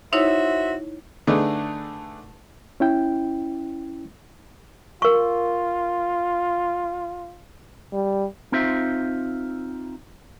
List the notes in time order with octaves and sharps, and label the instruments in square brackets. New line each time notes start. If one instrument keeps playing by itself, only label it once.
[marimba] D#4 E4 C#5 [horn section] F#4 C5 E5
[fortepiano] D3 A3 D4 D#4 G#4 B4
[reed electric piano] C#4 E4 G5
[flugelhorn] F4 [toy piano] A#4 C#6
[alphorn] G3
[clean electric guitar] C4 D#4 F4 C5 E5